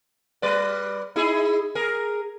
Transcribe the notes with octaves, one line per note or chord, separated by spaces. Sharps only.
G3 B4 D5
D#4 E4 G#4
G#4 A#4